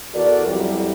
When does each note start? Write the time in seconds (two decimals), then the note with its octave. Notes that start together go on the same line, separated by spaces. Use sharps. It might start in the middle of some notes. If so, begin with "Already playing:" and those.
0.14 E2 F#4 A4 A#4 D5
0.46 F2 F#3 G3 E4 G4